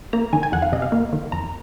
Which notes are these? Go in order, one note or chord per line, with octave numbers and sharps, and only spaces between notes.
A#3 A#5
D#3 G#5
G#5
F2 F#5
F5
C3 D#5
F5
A#3
D#3
F2 A#5